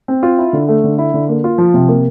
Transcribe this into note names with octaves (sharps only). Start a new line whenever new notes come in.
C4
F4
E4
D3
A3
D3
E4
D3
A#3
F4
F3
C3
A#3